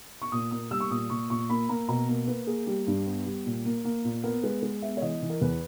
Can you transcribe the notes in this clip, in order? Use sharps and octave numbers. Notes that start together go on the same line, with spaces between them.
C#6
A#2 D#6
A#3 D#6
G3 E6
C#6
A#2 D#6
A#2 C#6
A#2 C#6
A#3 B5
A#3 A#5
B2 A#5
A#3
A#3 B4
A#3 G#4
G3 G4
G2
B3
G3
A#2
A#3
A#3
A#2
B3 A#4
G#3 B4
G#3
B3 E5
C#5
E3 D#5
E3
A#4
E2 B4